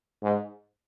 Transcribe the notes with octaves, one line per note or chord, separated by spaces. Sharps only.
G#2